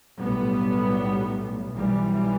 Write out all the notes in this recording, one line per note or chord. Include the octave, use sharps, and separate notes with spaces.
B1 A2 G3 B3
B1 B2 E3 G3